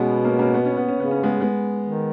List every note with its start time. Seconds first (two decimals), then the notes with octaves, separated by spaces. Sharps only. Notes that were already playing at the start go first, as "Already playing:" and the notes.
Already playing: B2 G#3 B3 C#4
0.24 A#3 C#4
0.39 A#3 C#4
0.54 B3
0.65 C#4
0.77 B3
0.89 C#4
0.97 C#3 B3
1.11 C#4
1.23 G#3 B3
1.41 G#3 B3
1.85 D#3